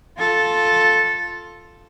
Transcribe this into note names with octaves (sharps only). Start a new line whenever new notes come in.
F4 A4